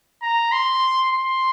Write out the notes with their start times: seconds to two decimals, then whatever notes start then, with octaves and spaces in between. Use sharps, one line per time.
0.23 A#5
0.52 C6
1.11 C6